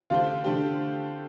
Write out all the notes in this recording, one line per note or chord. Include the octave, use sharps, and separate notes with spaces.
D3 A3 D4 F4 G4 C5
D3 A3 D4 G4 C5